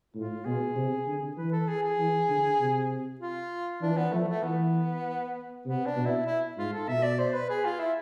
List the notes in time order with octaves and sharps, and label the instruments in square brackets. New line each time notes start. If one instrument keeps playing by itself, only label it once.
[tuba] A2 [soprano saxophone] F4
[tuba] B2 [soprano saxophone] G#4
[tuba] C3
D3
[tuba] E3 [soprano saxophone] B4
[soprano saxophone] A4
G#4
G#4
[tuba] E3
D3
C3
[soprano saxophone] F4
[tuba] E3 [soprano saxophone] D4
[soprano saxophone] B3
[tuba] F3 [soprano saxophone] A3
[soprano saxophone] A3
[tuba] E3 [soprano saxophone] B3
[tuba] C3 [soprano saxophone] B3
[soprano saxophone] D4
[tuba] B2
[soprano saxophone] E4
E4
[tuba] G#2 [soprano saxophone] F4
[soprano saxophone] A4
[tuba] B2 [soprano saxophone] E5
[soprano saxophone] D5
C5
B4
G#4
F4
E4